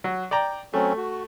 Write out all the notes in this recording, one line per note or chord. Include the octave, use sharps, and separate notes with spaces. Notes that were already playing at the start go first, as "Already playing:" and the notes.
F#3
D5 G5 A#5
F#3 A3 C4 C#4
F#4